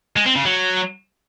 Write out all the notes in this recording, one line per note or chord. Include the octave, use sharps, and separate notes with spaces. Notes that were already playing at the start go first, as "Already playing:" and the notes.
G#3
C4
C#3
F#3